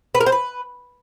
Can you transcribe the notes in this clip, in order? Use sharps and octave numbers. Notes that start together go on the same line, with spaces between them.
B4
A#4
C5
B4